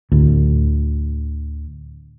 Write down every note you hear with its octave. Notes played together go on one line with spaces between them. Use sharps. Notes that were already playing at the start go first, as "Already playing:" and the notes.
D2 A2